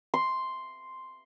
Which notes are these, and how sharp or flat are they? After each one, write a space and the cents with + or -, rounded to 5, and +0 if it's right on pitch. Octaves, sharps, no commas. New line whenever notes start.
C6 +0